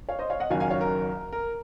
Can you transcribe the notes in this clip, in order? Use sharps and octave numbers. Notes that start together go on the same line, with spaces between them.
C#5 F5
C5 D#5
C#5 F5
D#5 F#5
F#1 F#2 D#3 F#3 F5 G#5
F5 G#5
C#5 F5
A#4
A#4